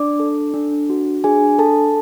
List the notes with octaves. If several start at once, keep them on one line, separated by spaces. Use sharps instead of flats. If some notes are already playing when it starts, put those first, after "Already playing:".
Already playing: D4 D5 D6
A4
D4
F#4
D4 G#4 G#5
A4 A5